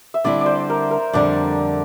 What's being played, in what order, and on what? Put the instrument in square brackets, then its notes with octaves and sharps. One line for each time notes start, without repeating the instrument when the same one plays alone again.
[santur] E5
[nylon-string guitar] D3 G3 C4 E4 [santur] D5
[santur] C5 D5
A#4
A#4
[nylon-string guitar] F2 D3 G3 [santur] D4